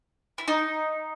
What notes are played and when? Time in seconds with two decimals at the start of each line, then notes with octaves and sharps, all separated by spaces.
0.38 E4
0.48 D#4